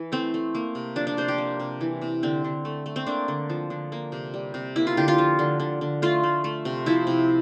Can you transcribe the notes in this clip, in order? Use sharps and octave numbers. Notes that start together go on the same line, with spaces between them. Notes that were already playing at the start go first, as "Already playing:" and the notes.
Already playing: E3
A3 C4
A3
A#3
C3
F3 D4
D4
C3 C5
G4
A#3
C3
E3
C3
D3 C4
D3
A3
A3
C4
A#3 D4
D3
F3
D3
A#3
C3
G3
C3
A#3 E4
F4
D3 G4
F4
F3
D3
D3
D3
A3 F4
A3
A3
C3
F3 E4
C3